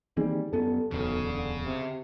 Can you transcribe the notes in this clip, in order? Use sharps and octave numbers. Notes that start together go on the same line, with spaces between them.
D#3 E3 G3 A#3 C4 D#4 G#4
G1 F#2 B3 C#4 A4
D1 B1 E2 C#3
D3
C3